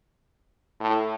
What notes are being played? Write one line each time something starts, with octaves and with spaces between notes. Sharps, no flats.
A2